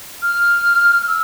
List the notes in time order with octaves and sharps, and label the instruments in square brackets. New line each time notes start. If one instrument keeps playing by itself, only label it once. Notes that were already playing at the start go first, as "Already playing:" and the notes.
[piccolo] F6
E6